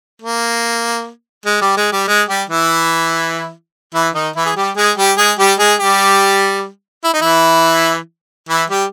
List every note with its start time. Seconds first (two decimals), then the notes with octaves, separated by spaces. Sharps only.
0.22 A#3
1.46 G#3
1.61 G3 G4
1.77 G#3 G#4
1.92 G3 G4
2.08 G#3 G#4
2.29 G3 G4
2.49 E3 E4
3.94 E3 E4
4.15 D#3 D#4
4.36 E3 E4
4.46 G#4
4.56 G3 G4
4.77 G#3 G#4
4.98 G3 G4
5.18 G#3 G#4
5.39 G3 G4
5.59 G#3 G#4
5.80 G3 G4
7.04 E4
7.14 D#4
7.22 E3 E4
8.49 E3 E4
8.70 G3 G4